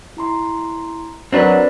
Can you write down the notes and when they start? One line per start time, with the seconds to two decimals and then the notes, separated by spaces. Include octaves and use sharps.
0.17 E4 A#5 C6
1.33 F#3 C4 D4 F#4 A#4 B4 D5